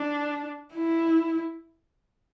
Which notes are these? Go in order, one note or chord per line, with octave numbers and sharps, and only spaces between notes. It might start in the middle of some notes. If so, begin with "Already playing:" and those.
Already playing: D4
E4